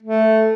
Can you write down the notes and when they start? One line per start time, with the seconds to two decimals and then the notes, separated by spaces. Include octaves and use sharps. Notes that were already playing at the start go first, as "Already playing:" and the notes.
0.03 A3